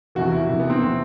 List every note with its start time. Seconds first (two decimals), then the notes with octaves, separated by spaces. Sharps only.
0.15 E2 C3 E3 F#4
0.32 E4
0.48 E2 C3 E3
0.60 B3
0.70 C4
0.82 C3 E3